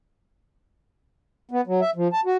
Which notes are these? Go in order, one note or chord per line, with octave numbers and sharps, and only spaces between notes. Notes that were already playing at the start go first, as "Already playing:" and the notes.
B3
F#3
E5
F3
A5
F#4